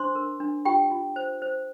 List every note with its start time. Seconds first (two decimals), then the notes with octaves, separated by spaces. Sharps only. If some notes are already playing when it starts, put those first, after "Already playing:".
Already playing: D4 C5 C6
0.15 A#4
0.40 D4
0.65 F4 G4 G5
0.91 F4
1.16 C5
1.42 C5